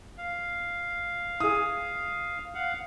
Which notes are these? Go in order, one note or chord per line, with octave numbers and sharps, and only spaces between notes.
F5
E4 G#4 D#6
F5 F#5